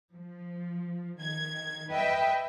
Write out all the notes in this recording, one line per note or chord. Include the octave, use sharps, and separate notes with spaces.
F3
D#3 G#6
B4 D#5 E5 G5